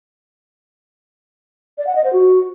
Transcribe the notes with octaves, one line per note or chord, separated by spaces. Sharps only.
D5
F#5
D#5
C5
F#4